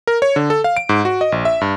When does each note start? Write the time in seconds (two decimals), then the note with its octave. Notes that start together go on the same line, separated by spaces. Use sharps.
0.07 A#4
0.22 C#5
0.36 D3
0.50 A4
0.64 F5
0.77 D7
0.89 G#2
1.05 F#4
1.21 D#5
1.32 A#1
1.45 E5
1.61 G2